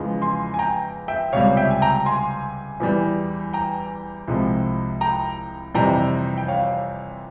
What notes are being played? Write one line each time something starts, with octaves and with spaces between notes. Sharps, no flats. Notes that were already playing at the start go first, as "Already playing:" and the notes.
Already playing: E2 C#3 F3 G#3
G#5 C6
G#5
G5 A#5
E5 G5
C#2 C3 G3 C#5 F5
E5 G5
G#5
G5 A#5
G#5 C6
E2 E3 G3
G5 A#5
C2 C3 F3 G#3
G5 A#5
F2 C3 E3 G3 G5 A#5
G5
C#5 F5